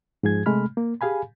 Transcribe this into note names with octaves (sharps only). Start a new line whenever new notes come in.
G#2 F3 G#4 G#6
C3 G#3 A3 B5 F6
A#3
G4 G#4 F5 G#5 B5